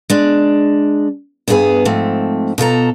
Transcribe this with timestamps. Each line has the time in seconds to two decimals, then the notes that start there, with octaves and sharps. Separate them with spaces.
0.10 G#3 D4
1.48 E2 G2 B3 G#4 B4 G#5
1.85 G#2 F3 A3 C4
2.58 B2 F4 A4 A#5